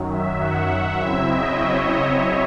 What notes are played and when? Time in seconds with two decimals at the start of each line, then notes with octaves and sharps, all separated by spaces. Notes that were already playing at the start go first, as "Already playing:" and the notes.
Already playing: F#2 D#3 F#3
0.09 E5
0.39 F#5
0.69 E5
0.98 C#3 F#3 C4 E4 E5
1.28 D#5
1.58 C#5